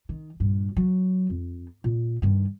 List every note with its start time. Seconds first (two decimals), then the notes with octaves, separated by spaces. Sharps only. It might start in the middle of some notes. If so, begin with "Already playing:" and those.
0.09 D#3
0.40 G2 A#2
0.77 F#3
1.30 F2
1.84 A#2
2.22 G2 D#3